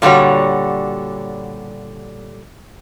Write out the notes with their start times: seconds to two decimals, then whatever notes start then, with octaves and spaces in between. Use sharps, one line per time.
0.02 A#2 D3 G3 F#4 C#5